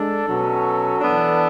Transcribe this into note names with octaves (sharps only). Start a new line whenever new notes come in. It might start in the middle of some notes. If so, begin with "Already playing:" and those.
Already playing: G#3 D4 A4
B2 F#3 C#4
E3 B3 D4